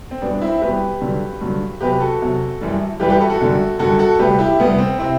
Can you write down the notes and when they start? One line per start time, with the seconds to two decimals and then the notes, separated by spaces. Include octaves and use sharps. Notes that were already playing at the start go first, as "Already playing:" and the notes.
0.11 C4
0.22 E2 B2 G3 B3 D4
0.41 C4 E4
0.61 E2 B2 G3 G4 B4
1.01 G2 D3 F#3
1.41 G2 D3 F#3
1.81 E2 C3 F#3 G4 B4
2.00 F#4 A4
2.21 E2 C3 F#3
2.61 F#2 E3 G3
3.00 F#2 E3 G3 G4 B4
3.10 G4 B4
3.20 F#4 A4
3.30 F#4 A4
3.41 F#2 D3 G3
3.79 F#2 D3 G3 F#4 A4
3.99 F#4 A4
4.19 D2 C3 G3 G4 B4
4.39 E4 G4
4.60 D2 C3 G3 B3
4.78 C4
4.98 C3 C4 E4